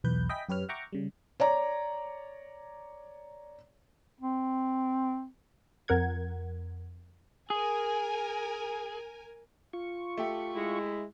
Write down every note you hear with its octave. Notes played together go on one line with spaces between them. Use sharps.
B1 E2 B4 G6
D#5 E5 G5 G#5 B5 B6
F#2 G4 B4 C#5 F6
E5 F#5 G5 A#5 C#6 D6
C#3 G3
C#5 D5 A#5
C4
F2 A#4 F#5 G#6
G#4 A#4 G#5
F4 C#6
A3 G4
G#3 E4